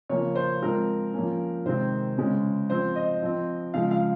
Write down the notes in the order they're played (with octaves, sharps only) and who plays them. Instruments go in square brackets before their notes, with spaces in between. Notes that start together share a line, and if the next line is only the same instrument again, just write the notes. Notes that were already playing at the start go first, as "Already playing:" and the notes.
[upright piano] C#3 F3 A#3 C#4 C#5
C5
F3 G#3 C4 A#4
F3 A#3 C#4
C3 D#3 G#3 C4 C5
C#3 G#3 C#4
F3 C4 C5
D#5
F3 C4
C#3 F3 G#3 F5
F5